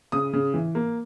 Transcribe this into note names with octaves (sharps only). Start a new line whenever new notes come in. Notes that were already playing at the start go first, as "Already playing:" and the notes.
C#3 D#6
C#3
E3
A#3